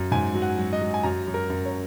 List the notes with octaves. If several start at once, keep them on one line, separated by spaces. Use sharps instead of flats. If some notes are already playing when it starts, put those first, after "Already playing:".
Already playing: F#2
G#2 G#5
F#3
F#5
F#3
D#5
F#3
G#5
F#2 A#5
F#2
A#4
F#2
C#5